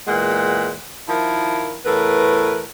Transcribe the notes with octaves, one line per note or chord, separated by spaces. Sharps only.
E2 A#2 G#3 F#5
D#3 F3 E4 A#4
E2 A2 A#4 B4